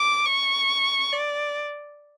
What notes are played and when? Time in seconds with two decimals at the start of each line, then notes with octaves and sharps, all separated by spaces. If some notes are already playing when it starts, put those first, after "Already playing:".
Already playing: D6
0.26 C#6
1.13 D5